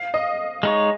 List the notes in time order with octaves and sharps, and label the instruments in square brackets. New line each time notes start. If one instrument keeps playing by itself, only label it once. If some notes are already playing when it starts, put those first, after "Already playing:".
Already playing: [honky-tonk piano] F5
D#5
[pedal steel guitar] G#3 D#4 C#5